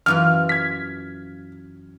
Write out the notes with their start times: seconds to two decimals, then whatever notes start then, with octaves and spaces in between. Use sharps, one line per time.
0.06 F#2 E3 F4 F6
0.49 G#6 B6